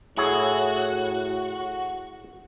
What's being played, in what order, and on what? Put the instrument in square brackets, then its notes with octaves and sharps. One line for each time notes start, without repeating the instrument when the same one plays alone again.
[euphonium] A2 [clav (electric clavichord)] E4 G#4 C#5 [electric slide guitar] F#4